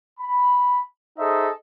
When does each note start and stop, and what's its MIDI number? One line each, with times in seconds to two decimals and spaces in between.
0.20 0.79 83
1.19 1.49 63
1.19 1.49 68
1.19 1.49 69
1.19 1.49 72
1.19 1.49 75
1.19 1.49 76